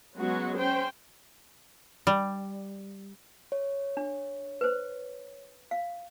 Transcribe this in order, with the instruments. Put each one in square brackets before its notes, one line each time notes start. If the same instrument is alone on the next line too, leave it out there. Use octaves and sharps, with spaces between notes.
[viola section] F#3 G#3 B3 C#4 F#4
C#4 C5 G5
[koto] G3
[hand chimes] C#5
[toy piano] D4
B4 C5
F5